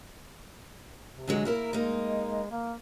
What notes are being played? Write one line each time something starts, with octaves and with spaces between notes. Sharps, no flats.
C3
D3 F#3 G#3
A#3 E4 A#4
G#3 A#3 D#4
A#3